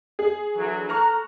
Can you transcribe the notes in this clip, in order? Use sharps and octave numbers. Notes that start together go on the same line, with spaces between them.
G#4
D3 E3 F#3
A4 A#5 C#6 F6 F#6